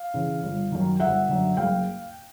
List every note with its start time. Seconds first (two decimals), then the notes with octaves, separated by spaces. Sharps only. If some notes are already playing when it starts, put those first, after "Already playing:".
Already playing: F5
0.14 C#3 E3
0.44 G1
0.72 F#2 D#3
1.00 G1 E5 F#5
1.29 F#2 D3
1.57 F#1 F5 G5